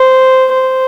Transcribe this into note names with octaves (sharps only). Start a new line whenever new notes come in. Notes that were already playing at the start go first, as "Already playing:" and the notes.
Already playing: C5
C5